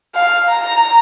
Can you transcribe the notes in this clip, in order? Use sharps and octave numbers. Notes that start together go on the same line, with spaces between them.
F5
A#5